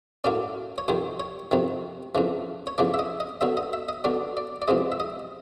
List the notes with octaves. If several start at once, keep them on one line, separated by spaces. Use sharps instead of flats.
A2 F#3 A#3 C#4 D5
C#5
F2 C3 D#3 C5
C#5
F2 C3 D#3
F2 C#3 E3
C#5
F2 C#3 E3 D5
E5
D#5
D#5
D3 F#3 B3 E5
D#5
E5
D#5
D3 F#3 B3 D5
D5
D5
F2 C3 E3 G#3 D#5
E5
D#5